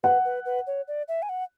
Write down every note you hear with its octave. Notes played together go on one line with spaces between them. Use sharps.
B4 F#5
B4
B4
C#5
D5
E5
G#5
F#5